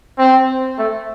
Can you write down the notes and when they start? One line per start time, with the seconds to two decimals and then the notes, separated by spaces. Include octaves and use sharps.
0.19 C4
0.78 A3